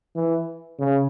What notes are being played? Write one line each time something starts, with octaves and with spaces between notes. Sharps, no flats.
E3
C#3